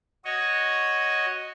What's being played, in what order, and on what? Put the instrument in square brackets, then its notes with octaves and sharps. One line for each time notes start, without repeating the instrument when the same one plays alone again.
[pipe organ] F#4 C#5 D#5